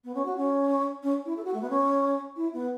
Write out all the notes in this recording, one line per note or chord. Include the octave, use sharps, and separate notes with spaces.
B3
C#4
F#4
C#4
C#4
E4
A4
F#4
A3
B3
C#4
E4
B3